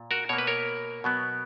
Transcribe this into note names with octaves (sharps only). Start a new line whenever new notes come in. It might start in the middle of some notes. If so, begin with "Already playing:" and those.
Already playing: A#2
F#4 A#4
B2 A#3 C#5
B4
A#4 C#5
B2 F#3 B3